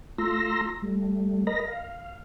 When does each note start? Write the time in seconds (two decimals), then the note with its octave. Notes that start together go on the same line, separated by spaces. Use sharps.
0.18 A3 F4 A#5 C6 E6 A#6
0.82 G3 A3
1.47 A#4 D#5 A#5 B5 A#6
1.68 F5